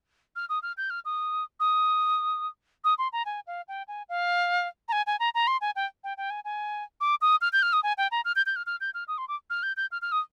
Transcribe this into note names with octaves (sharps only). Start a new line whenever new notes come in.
F6
D#6
F6
G6
F6
D#6
D#6
D#6
C6
A#5
G#5
F5
G5
G#5
F5
A#5
G#5
G#5
A#5
A#5
C6
G#5
G5
G5
G5
G#5
G#5
D6
D#6
F6
G6
F6
D#6
G#5
G5
A#5
F6
G6
G6
F6
F6
G6
F6
D#6
C6
D6
F6
G6
G6
F6
F6
D#6